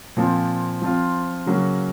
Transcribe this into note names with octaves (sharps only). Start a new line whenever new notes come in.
A#2 F3 C4
F3 C4 F4
C#3 F#3 A#3 C#4 F#4